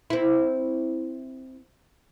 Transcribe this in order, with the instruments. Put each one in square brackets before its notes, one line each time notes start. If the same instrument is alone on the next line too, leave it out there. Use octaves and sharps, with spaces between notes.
[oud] C4 E4